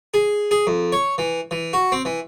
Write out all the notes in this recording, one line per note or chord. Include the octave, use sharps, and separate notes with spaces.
G#4
G#4
F2
C#5
E3
E3
F#4
C4
E3